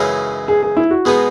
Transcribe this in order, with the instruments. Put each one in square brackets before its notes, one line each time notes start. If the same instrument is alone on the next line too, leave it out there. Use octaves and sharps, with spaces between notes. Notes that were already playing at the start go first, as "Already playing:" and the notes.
Already playing: [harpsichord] F#2 C#3 E3 G#3 D#4 [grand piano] G#4
[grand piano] G#4
G#4
E4
F#4
[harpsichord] B2 G#3 B3 D#4 [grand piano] G#4